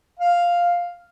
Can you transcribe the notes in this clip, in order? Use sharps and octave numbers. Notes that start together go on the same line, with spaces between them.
F5